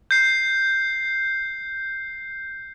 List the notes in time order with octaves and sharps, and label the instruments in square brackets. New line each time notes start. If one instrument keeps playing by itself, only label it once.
[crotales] G6 C7